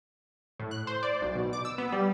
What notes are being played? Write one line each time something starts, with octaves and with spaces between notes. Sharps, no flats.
A2
F#6
C5
D5
B1
B2
D6
E6
B3
G3